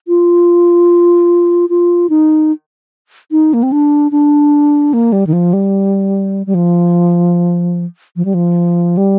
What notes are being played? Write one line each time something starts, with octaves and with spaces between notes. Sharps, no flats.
F4
F4
D#4
D#4
A#3
C4
D4
D4
A#3
G3
D#3
F3
G3
G3
F3
F3
G3
F3
G3